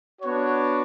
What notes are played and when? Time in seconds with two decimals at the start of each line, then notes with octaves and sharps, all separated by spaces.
0.22 B3 D4 F#4 C#5